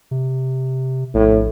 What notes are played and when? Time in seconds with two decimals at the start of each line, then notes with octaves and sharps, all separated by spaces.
0.11 C3
1.14 A#1 A2